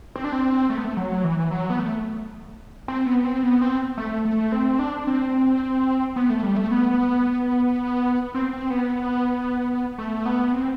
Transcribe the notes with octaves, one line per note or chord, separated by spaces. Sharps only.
C4
D4
C4
A3
B3
A3
F#3
E3
F#3
B3
A3
C4
B3
C4
B3
C4
A3
A3
C4
D4
C4
B3
A3
G3
A3
B3
C4
C4
B3
A3
B3
C4